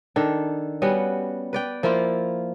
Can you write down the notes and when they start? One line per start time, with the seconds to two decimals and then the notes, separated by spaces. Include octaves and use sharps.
0.16 D#3 D4 A4
0.82 G3 B3 C#4 F#4
1.53 B4 D5 G5
1.83 F3 A#3 E4 F4